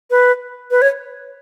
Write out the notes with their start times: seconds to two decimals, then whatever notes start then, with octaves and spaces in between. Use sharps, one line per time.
0.11 B4
0.71 B4
0.82 C#5